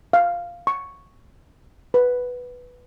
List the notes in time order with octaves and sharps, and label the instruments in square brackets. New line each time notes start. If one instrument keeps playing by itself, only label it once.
[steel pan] F5
C#6
B4